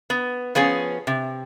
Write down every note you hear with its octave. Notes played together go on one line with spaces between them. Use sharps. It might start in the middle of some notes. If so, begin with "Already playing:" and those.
B3
F3 B3 C#4 G#4
C3